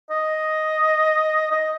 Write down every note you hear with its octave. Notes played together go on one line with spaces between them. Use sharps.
D#5
D#5